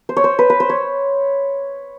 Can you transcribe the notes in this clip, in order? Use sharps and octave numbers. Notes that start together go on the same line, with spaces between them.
C5
C#5
C5
B4
B4
C5
C#5